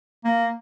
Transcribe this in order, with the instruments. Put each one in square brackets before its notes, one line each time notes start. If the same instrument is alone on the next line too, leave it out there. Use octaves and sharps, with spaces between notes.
[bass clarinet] A#3